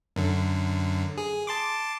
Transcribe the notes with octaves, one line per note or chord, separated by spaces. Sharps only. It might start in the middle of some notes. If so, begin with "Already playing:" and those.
F#2 D3
G#4
A5 C6 D6